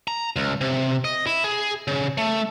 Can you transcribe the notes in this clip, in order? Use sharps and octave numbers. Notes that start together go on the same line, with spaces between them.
A#5
C#2
C3
D#5
E4
G#4
C#3
A3